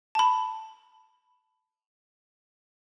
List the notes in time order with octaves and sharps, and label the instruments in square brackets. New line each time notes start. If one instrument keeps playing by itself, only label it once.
[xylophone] A5 B5